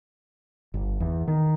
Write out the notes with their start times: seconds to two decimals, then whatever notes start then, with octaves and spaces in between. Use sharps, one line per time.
0.74 G1
1.00 E2
1.28 D#3